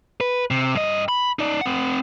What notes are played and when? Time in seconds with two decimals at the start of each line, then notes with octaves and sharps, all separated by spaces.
0.21 B4
0.51 C3
0.75 G2 D#5
1.09 B5
1.39 D#4 D5
1.61 C4 F#5